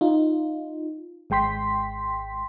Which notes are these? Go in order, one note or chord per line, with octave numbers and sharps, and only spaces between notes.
D#4 F4
G#1 G#3 G5 C6 B6